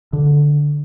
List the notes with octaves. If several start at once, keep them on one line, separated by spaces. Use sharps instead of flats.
D3